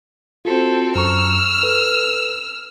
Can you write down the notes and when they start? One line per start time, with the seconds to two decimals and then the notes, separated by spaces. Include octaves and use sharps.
0.45 C4 F4 F#4 A4
0.96 F#2 A#5 C#6 E6 F6
1.63 A4 B4